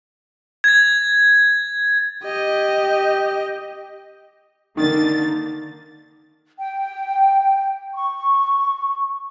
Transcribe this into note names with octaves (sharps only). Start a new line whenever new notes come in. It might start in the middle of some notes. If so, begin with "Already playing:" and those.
G#6 A6
G4 D#5
D3 D#3 A#3 A6
G5
C#6